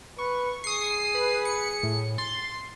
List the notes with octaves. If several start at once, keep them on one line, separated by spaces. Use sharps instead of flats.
B4 C#6
G#4 D#6 C7
B4
C#7
A2
C6 A6